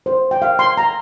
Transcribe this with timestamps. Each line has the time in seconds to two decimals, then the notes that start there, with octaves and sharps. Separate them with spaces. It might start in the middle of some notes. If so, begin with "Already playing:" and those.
0.06 C5
0.31 G5
0.42 F5
0.59 C6
0.77 A#5